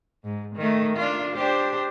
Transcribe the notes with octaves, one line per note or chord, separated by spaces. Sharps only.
G#2
D#3 A3
D4 F4
D4 G4 C5